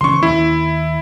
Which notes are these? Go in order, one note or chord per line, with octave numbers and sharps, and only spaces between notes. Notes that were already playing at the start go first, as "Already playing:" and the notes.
C#2 E3 C#4 C6 C#6
D#2 E4